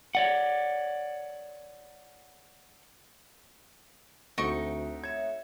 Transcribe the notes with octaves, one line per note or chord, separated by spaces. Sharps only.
C#5 D5 F#5
D2 A3 C4 D#4 F#4 C#6 A#6 D7
C#5 E5 G#6